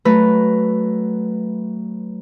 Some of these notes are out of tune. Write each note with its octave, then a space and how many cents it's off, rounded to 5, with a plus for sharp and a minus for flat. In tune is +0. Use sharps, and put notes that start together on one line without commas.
F#3 +15 A3 +0 B4 +0